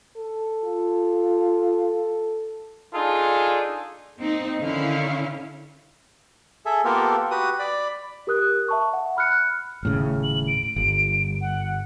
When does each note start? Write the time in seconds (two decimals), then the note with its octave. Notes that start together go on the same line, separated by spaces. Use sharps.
0.17 A4
0.64 F4
2.94 D4 D#4 F4 G#4 A4
4.18 A#3 C4 D#4
4.62 D3 D#3 C#4 E4 F5
6.66 G#4 A4 E5
6.85 A#3 B3 F4 G4 A4 A#4
7.31 F#4 G4 B4 D#6
7.59 D5 B5
8.27 G4 A#4 D#6 F#6
8.68 E5 A5 C#6
8.93 E5 F#5
9.17 B5 F6 F#6 C#7
9.83 D#1 A2 C#3 F6
10.23 F#7
10.48 D7
10.76 G1
11.41 F#5